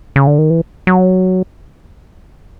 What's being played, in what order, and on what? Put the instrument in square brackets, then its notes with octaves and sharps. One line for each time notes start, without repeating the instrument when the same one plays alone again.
[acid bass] C#3
D3
D#3
E3
F#3